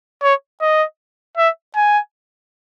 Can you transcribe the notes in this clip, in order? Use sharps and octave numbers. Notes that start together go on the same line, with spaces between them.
C#5
D#5
E5
G#5